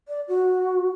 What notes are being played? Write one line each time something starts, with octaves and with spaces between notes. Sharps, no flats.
D5
F#4